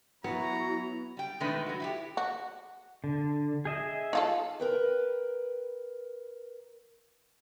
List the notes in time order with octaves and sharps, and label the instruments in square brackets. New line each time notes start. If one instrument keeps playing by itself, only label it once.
[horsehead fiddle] F#3 E4 [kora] B3 [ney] F#4 [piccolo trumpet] A#5
[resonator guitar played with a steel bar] G3 G5
B2 D#3 G#3 A3 D4 B4
F#3 F#4
E4 F#4 G4
[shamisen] F#4
[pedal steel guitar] D3
G#4 D#5 E5
[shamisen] D#4 F4 A4
[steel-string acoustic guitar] A#4 B4 G5